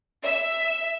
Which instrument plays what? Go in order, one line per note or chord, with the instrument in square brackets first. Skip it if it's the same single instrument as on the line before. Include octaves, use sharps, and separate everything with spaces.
[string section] E5